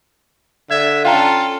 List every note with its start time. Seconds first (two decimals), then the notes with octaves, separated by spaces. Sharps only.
0.71 D3 E5 G#6
1.05 C#4 F4 A4 F5 G5 A#5